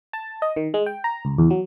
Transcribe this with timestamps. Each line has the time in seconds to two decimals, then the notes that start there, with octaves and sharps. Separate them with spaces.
0.13 A5
0.42 D#5
0.56 D#3
0.74 G#3
0.86 G5
1.04 A#5
1.25 C#2
1.38 E2
1.50 F#3